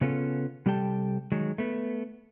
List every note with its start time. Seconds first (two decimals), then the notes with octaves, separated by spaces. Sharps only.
0.01 C#3 B3 C#4 F4 A4
0.66 C3 G3 G4 A4 G5 A5
1.32 D#3 F#3 G#3
1.58 A3 B3